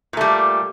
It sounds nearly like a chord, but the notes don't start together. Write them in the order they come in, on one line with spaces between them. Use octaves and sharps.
A#2 A3 G3